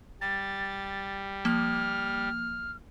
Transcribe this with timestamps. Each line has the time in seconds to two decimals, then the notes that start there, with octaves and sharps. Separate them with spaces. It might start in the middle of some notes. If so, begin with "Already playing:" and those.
0.21 G3 A6
1.45 F3 A#3 F6